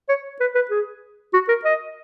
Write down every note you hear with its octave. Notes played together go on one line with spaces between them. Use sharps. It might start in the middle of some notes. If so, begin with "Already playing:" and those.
C#5
B4
B4
G#4
F#4
A#4
D#5